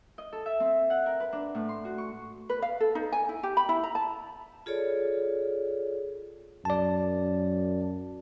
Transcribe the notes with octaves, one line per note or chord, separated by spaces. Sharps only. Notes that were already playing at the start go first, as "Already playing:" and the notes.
D#5
A4
E5
C4
F#5
A#4
B4
D4
A2
C6
F#4
C#6
B4
F5
A4
D#4
G#5
E4
G4
B5
E4
A#5
A5
F4 G#4 A4 C#5 D5
F#2 D5 A5